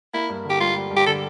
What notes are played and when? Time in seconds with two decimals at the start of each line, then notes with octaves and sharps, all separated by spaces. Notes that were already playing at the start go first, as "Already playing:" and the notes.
0.13 A#3 E4
0.29 G2
0.45 D3 G4
0.60 G3 F4
0.76 G3
0.91 G2
0.97 G4
1.06 D3 A4